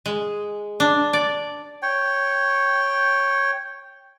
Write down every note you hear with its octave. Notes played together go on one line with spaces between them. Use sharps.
G#3
D4
D5
C#5 G5